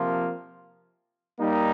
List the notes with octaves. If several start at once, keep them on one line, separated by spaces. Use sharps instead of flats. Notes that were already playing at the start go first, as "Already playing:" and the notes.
Already playing: C3 F3 A#3 F4
G3 A#3 D#4